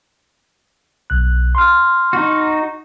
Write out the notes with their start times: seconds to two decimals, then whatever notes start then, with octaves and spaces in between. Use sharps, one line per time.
1.10 B1 F#6
1.55 C6 F6
2.13 D#4 F#4